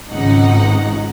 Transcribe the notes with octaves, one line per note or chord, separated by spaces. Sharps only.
G#1 C#2 G#2 D#4 F#5